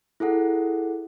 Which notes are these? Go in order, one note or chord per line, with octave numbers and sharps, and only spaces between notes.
E4 G#4 A4 F#5